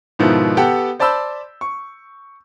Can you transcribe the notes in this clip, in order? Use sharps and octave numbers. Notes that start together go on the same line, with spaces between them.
G#2 B2 D#3 F3 B3 E4
B3 G4 A4 F#5 G5
C5 D5 A5 B5 E6 G6
C#6